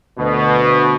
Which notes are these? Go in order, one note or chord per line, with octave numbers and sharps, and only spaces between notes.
D2 B2